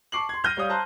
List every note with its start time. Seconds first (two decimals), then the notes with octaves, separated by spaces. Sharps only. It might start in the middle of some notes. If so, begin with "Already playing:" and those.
0.12 A5 C#6 D6 C7 F#7
0.29 C6 G#6
0.44 F6 G6 A#6 D#7
0.57 G3 C#5 F5 D#6
0.69 C5 A5 A#5 C6 F#6